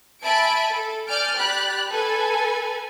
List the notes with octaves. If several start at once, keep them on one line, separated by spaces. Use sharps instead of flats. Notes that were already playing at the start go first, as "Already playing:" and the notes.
E5 G#5 A5 B5 D7
A4
D5 G#5 F6 G6 D7
G4 D5 B5 F#6 B6
A4 B4 G#5